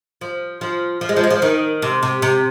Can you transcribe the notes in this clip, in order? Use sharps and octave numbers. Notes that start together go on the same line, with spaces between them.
F3
F3
F3
G#3
F3
G#3
F3
D#3
C3
C3
C3